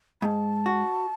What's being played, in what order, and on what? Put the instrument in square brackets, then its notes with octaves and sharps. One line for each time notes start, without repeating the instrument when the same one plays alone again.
[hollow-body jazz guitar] G#2 [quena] A5 B5
[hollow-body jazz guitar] F#4